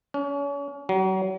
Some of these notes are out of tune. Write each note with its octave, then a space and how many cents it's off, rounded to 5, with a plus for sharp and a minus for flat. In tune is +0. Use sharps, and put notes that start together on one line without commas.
C#4 +35
F#3 +40